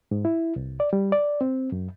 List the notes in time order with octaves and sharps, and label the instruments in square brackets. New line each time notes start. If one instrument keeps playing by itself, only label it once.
[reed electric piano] G#2
E4
C2
D5
G3
D5
C4
F#2